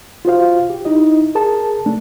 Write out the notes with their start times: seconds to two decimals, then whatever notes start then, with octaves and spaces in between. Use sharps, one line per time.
0.25 F4 F#4 C5 F5
0.70 G4
0.85 D#4 E4 D#5
1.35 G#4 A#4 A5
1.86 A3 D4